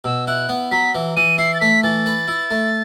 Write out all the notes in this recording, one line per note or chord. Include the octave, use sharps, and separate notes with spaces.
B2 E6
E4 F#6
B3
F#3 B6
E3
E3 D#7
E4 C7
A6
A3 B6
E3 A6
B4
E4
A3